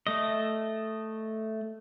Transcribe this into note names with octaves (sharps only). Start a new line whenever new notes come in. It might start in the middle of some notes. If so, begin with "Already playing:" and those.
A3 D#5